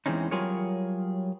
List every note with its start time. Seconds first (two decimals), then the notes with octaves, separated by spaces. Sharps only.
0.06 E2 E3 G#3 C4 C#4 D#4
0.31 F#3 G3 F4 G#4 A#4 C#5